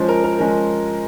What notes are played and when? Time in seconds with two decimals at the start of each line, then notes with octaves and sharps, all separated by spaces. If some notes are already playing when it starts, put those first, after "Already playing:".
Already playing: F3 G#3 C#4 C5
0.09 A#4
0.24 A#4
0.39 F3 G#3 C#4 A#4